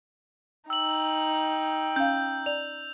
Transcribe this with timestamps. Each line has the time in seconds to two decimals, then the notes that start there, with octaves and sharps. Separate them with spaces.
0.70 D#4 G5 E6 F#7
1.96 C#4 F5 G6
2.46 D5 F7